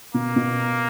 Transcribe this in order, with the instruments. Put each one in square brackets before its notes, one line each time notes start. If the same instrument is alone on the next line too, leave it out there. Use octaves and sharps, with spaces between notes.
[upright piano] B2 [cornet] A#3
[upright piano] B2